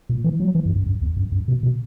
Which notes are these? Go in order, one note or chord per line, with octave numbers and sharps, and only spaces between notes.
A#2
E3
F#3
E3
F#2
F#2
F#2
E2
F#2
F#2
B2
B2